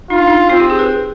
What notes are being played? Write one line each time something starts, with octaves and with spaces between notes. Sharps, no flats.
D#4 F4
D4
D#4
C4 F4
G4
G#4
B4